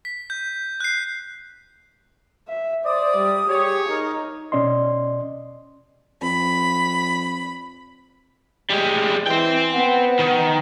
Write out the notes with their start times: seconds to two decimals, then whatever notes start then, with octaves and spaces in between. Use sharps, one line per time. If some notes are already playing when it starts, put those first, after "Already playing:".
0.05 B6
0.30 G6
0.80 F#6 C7
2.48 E5
2.85 C5 D5 D#6
3.17 G3
3.49 G4 G#4 C#5
3.89 D#4 A#4
4.52 B2 C#4 D5 D#5 C6
6.22 F2 B5
8.70 G3 G#3
9.27 E3 C5 G5
9.73 B3
10.20 D#3